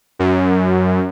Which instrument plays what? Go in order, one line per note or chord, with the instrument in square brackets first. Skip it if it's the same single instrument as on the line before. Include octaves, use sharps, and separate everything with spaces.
[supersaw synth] F#2